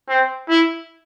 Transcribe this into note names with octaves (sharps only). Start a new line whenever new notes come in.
C4
E4